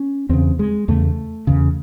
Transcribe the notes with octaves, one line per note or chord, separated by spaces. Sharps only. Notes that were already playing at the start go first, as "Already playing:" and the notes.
Already playing: C#4
E2 C#3 C4
G#3
E2 C#3 A3
E2 C#3